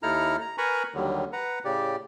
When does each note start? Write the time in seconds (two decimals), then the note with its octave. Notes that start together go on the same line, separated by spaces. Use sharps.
0.03 D#2 D#4 E4 A4 A#5 F6
0.41 A#5
0.58 A#4 B4 G#5 A#5 B5 C#6
0.94 D#2 D3 D#3 F#3 G3
1.33 B4 F#5 A#5
1.65 A2 C#3 G4 D5